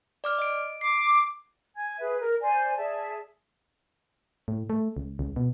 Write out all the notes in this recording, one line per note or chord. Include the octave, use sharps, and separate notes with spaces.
D5 D6 F6
D#5 D7
D6 C7
G#5 G#6
G#4 B4 E5
A#4
C5 D5 G#5
G#4 D5 E5 A5
A2
A3
C#2
C#2
B2